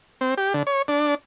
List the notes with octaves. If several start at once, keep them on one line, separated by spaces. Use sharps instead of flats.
C4
G4
D3
C#5
D4